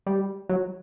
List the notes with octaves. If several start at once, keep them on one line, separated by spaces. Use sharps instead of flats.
G3
F#3